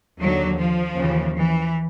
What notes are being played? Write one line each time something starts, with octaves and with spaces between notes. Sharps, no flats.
D#2 D3 F#3
F3
D#2 C#3 E3
E3